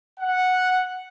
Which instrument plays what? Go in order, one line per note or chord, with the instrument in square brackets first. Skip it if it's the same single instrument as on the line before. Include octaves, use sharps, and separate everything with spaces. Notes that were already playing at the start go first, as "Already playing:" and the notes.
[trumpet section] F#5